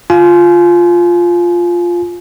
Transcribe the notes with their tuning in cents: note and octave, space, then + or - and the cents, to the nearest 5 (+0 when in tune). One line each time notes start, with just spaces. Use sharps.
F4 +0 G#5 +35